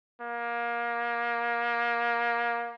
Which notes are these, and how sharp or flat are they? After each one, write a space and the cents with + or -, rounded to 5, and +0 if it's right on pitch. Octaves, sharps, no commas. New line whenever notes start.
A#3 +20